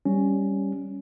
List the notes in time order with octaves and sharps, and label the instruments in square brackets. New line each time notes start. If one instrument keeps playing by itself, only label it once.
[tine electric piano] G3 C#4